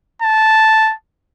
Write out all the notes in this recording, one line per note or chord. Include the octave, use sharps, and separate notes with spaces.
A5